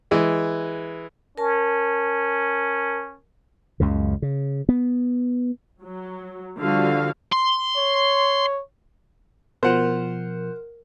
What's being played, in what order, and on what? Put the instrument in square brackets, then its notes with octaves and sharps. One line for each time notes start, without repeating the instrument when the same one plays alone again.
[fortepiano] E3 G#3
[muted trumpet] C#4 [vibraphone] A#4 A5
[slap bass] C#2 F#2 C#3
C#3
B3
[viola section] F#3
D3 F3 G3 F#4 F5
[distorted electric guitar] C6
[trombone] C#5
[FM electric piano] B2 F3 [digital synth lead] A#4 [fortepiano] C5 F#5